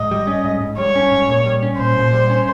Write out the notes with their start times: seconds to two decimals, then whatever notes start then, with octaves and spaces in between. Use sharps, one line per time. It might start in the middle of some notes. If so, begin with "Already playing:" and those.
Already playing: G#2 D#5
0.11 G3
0.27 C#4
0.44 G#2
0.61 G#2
0.78 G3 C#5
0.96 C#4
1.11 G#2
1.29 A#2
1.46 G3
1.63 C#4
1.79 A#2 C5
1.97 A#2
2.13 G3
2.30 C#4